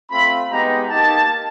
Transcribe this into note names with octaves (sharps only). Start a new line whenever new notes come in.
A3 C4 F4 B5
G#3 B3 D#4 G4 A#5
A#3 D#4 G4 A5